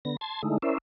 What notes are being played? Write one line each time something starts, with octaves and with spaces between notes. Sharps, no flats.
D3 B3 A#6
A5 C6 G#6
D3 G#3 A3 D#4 E4
C#4 E4 A#4 C5 D5 E5